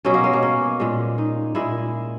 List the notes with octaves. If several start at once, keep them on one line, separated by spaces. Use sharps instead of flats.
B2 F#3 C#4
A#3
G#3
A#3
C#4
A#2 G#3
D#4
A#2 G#3 E4